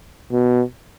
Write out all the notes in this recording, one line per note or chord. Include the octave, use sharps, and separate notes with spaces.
B2